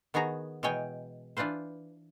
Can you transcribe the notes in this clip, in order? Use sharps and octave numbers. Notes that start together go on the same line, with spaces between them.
D#3 B3 F#4 G#4 A#5
B2 E3 G#3 C#5 G5 G#5
E3 D4 F4 B4 C5